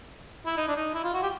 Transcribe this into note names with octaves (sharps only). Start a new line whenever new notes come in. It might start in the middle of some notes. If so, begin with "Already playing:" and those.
E4
D#4
D4
D#4
E4
F4
F#4
G4